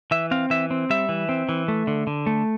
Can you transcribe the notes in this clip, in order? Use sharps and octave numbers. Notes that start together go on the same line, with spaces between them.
E3 E5
C4 F5
E3 E5
C4
G3 E5
E3
C4
E3
A3
D3
D3
A3